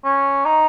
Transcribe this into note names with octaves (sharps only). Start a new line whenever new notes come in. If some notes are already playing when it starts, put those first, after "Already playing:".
C#4
D#4